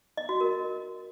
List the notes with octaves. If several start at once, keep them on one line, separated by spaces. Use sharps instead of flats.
D#5
F#4
A#4